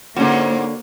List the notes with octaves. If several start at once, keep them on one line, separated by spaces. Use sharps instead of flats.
F2 G#2 D3 A#3 C#4 F#4